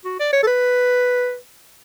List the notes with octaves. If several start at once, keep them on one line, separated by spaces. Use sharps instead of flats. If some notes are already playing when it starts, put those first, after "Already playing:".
F#4
D5
C#5
A4
B4